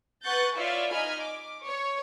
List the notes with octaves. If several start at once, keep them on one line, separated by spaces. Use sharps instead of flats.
B4 F#5 C#6 F#6 G6 A6
E4 F4 C#5 D5 E5 F5
D#4 D#5 G#5 B5 F6 G#6
D6
C#5